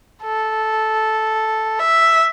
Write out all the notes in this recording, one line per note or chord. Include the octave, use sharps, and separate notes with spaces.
A4
E5